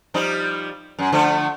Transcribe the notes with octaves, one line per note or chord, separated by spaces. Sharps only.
F3 G3 D#4
F#2
D3 F3 A3